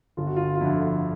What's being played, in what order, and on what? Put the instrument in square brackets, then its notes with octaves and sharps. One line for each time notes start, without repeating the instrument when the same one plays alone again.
[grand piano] G1 F4
F#4
F4
F4
F2 D3 E4